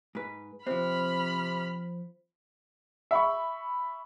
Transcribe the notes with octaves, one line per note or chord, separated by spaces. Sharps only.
G#2 B4
C3 F3 C4 C5 B5 F6
E5 B5 C#6